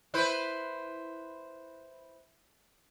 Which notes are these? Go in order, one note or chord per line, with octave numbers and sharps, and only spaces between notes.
E4 B4 C5